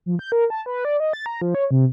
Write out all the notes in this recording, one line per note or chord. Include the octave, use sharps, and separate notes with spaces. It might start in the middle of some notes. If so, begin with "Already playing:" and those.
F3
G6
A#4
A5
B4
D5
D#5
A6
A#5
F3
C#5
C3